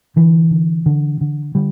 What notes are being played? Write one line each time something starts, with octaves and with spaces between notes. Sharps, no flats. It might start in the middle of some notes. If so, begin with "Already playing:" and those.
D3 E3
D3
D3
D3
D3 G3